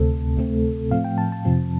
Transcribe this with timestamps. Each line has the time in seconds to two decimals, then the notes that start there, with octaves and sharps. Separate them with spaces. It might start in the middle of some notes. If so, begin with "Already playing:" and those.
Already playing: D2 C3 A3 C4 A4
0.37 D2 C3 A3 C4
0.90 A2 F3 A3 C4 F5
1.04 G5
1.18 A5
1.32 A5
1.45 F2 C3 F3 C4